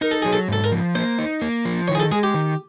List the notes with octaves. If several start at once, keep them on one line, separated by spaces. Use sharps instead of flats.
D#4 A#4
A4
F#3 G#4
A4
G#2 A4
A#4
F3
A#3 C5
D#4
A#3
F3
D#3 C#5
G#4
A4
G#3 G#4
G4
D#3